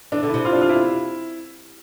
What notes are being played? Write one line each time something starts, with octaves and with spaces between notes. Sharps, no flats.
E3 D4
D3
E4
C3
F4
D4
F4
E4